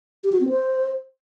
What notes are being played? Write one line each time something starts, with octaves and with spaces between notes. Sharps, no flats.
G4
F#4
C4
C5